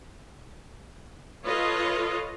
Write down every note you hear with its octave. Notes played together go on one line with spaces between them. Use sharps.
F4 A4 B4 C#5 D#5 F5